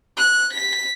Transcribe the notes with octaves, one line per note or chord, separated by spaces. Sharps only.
F#6
B6